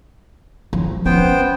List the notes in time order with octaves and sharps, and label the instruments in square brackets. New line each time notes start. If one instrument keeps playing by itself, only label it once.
[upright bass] F3
[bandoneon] B3 C5 G5 [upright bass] C#4